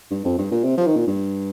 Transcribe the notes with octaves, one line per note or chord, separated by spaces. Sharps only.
G2
F2
G2
A#2
C3
F3
D#3
A#2
G2